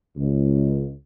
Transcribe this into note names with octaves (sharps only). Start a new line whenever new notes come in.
C#2